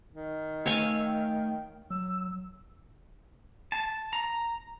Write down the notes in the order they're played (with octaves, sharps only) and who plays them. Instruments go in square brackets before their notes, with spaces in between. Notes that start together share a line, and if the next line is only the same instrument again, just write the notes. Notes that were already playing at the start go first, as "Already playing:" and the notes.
[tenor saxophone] D#3
[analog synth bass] A3 [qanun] C#5 F5 G#5 [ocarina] E6
[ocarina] G5
[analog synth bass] F#3 [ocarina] E6
[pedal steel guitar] A5
A#5